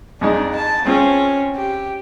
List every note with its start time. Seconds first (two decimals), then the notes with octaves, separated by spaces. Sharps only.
0.21 F2 G#3 D4 D#4
0.56 A5
0.85 G#3 C4 C#4 F4
1.56 G4